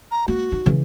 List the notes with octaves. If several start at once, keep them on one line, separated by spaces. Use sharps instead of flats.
A#5
A#3 F#4
D#4
C#3 E3